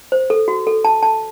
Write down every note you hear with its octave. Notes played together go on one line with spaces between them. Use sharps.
C5
A4
F#4
A4
A5
A5